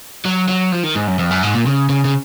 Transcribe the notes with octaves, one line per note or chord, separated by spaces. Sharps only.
F#3
F#3
F3
D#3
G#2
F#2
F2
F#2
G#2
A#2
C#3
C#3
C#3